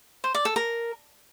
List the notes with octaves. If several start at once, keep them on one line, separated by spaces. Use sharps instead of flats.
C5
D5
A4
A#4